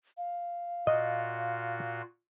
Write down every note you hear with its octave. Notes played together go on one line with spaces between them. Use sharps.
F5
A#2 F4 F#4 D#5